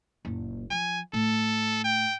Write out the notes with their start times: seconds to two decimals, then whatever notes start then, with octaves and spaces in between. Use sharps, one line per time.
0.25 F#1 A#2
0.71 F3 G#5
1.13 A2 A4
1.84 G5